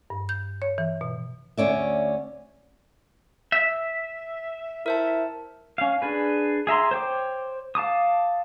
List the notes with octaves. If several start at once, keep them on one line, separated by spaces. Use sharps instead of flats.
G2
G6
C#5
E3
B2
D2 C#4 D5 E5
E5
E4 A#4 C5 A5
C#4 F5
D4 G#4 B4
G#4 E5 A#5 C6
C5 C#5 G5 D6
F5 A5 D6 D#6